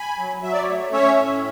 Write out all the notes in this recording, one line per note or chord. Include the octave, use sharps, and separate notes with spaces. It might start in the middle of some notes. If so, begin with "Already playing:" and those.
Already playing: G#5 B5
F#3
F#3 E5
D5
A3 C#5 E5
C#4 C#5 E5
A2